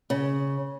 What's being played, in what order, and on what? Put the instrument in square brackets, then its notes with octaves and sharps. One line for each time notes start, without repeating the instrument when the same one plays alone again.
[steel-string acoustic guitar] C#3